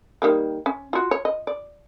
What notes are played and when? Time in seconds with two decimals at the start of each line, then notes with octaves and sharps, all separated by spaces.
0.22 D#3 G3 A#3
0.66 C#4
0.93 F4 F#4
1.11 C#5
1.25 D#5
1.47 D5